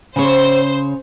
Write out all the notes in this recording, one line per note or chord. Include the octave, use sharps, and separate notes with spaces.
C#3 C5 C#5